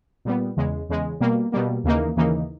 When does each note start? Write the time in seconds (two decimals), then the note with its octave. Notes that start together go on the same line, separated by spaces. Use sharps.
0.25 A#2 G3 B3
0.57 E2 C#3 G#3
0.89 E2 C#3 G#3
1.20 B2 G3 A#3
1.52 B2 G3 A#3
1.84 D#2 C#3 E3 A#3 D#4
2.16 D#2 C#3 E3 A#3 D#4